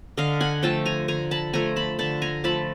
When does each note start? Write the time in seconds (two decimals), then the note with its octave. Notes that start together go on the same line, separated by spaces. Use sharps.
0.17 D3 D#5 F5
0.40 F#5 G#5
0.62 F3 A3 G5 A5
0.86 G#5 A#5
1.08 D3 G#5 A#5
1.31 A5 B5
1.53 F3 A3 G#5 A#5
1.76 A5 B5
1.99 D3 A5 B5
2.22 G#5 A#5
2.44 F3 A3 A5 B5